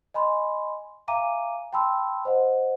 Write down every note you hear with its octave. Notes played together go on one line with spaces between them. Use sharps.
D#5 G#5 B5 C6
E5 F5 G#5 A#5 D6 D#7
G5 A5 B5 C6 E6
C5 D#5 F#5